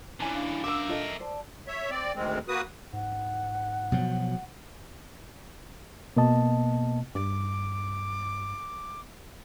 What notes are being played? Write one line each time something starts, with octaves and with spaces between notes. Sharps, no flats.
D3 E3 C#4 G#5 A#5
D4 F5
A#4 E5 D6 E6
F4 A4 D#5
C5 D5 A5
C#5 E5
C4 D5
D2 D#3 G#3 C4
A#3 F#4 B4 D#6
G#2 F#5
B2 F3 F#3
B2 A#3 B3 D#5 A5
G2 D6